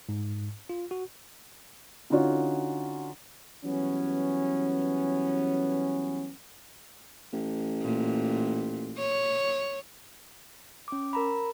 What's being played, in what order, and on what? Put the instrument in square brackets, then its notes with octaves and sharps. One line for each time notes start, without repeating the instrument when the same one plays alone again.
[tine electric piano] G#2
F4
F#4
[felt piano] D3 C#4 D#4 F4 F#4 C#5
[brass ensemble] E3 F#3 G3 B3 C#4
[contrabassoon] A1
[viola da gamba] A#2
C#5
[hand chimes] C#4 D6
A#4 A#5 B5